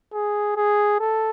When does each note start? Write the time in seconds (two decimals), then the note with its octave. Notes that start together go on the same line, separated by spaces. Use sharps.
0.13 G#4
0.56 G#4
0.99 A4